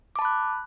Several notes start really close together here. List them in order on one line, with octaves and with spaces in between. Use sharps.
D6 A5 B5 F#6